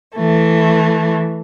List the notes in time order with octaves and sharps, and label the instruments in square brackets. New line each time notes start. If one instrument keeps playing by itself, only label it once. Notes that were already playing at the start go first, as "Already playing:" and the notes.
[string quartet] E3 A3